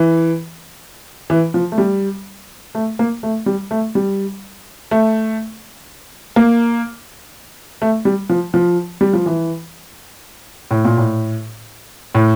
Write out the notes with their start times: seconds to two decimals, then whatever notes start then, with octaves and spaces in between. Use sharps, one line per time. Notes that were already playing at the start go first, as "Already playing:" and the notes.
Already playing: E3
1.30 E3
1.54 F3
1.72 A3
1.78 G3
2.75 A3
2.99 A#3
3.23 A3
3.46 G3
3.71 A3
3.95 G3
4.91 A3
6.36 A#3
7.82 A3
8.05 G3
8.29 F3
8.54 F3
9.01 G3
9.13 F3
9.26 E3
10.71 A2
10.85 A#2
10.97 A2
12.15 A2